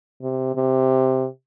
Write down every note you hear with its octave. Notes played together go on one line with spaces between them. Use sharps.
C3
C3